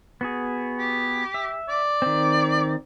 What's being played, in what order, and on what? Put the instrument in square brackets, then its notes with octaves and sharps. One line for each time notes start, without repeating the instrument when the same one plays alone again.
[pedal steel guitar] B3 F#4 G#4
[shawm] G4
[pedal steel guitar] E5
[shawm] D5
[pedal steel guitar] D#3 C4